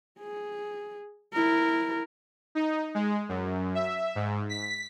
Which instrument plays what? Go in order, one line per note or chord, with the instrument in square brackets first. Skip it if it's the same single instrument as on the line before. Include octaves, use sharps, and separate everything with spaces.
[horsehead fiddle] G#4
E4 A#4
[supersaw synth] D#4
G#3
F#2
E5
G#2
B6